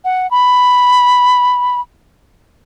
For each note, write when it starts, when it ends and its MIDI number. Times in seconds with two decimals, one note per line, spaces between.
0.05 0.29 78
0.31 1.80 83